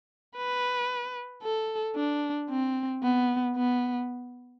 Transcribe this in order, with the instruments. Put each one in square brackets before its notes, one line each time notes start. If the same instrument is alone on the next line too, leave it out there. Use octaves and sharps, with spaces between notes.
[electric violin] B4
A4
D4
C4
B3
B3